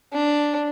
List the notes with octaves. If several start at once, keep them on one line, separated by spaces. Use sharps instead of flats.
D4